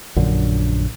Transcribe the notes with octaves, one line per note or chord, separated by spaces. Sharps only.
A#1 F#2 D3